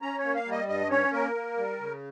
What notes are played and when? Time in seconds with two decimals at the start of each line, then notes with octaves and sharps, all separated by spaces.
0.02 C#4 A#5
0.18 C#5
0.24 A#3
0.35 F5
0.46 G3
0.51 D#5
0.68 G2 D#5
0.91 C#4 C#5
1.13 A#3 A#4
1.35 A#3
1.57 G3
1.80 C#3